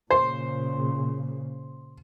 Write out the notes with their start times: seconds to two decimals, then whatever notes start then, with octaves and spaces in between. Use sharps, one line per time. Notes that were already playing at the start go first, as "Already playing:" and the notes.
0.10 A#2 C#3 C5